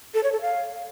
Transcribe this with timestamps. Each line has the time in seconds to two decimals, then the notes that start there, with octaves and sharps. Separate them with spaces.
0.14 A4
0.23 C#5
0.32 A4
0.41 F5